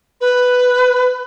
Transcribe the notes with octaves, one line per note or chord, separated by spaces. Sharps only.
B4